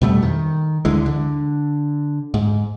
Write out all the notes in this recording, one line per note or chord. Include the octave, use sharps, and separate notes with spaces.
F2 B2 G3 A3
D#3
D2 D3 E3 G#3
D3
G#2